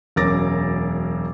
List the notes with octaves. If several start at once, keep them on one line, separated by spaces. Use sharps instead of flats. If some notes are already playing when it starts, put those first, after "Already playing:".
E1 F#2 A#4 D6 A6 A#6